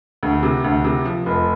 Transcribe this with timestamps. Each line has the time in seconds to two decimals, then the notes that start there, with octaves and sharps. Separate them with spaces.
0.23 D2
0.43 C3
0.64 D2
0.84 C3
1.05 F3
1.26 F1